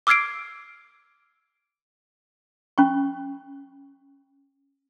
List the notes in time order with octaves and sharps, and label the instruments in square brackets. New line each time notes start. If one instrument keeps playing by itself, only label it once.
[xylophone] D6 E6 F6 G#6 C7 D7
[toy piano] C#4 C#6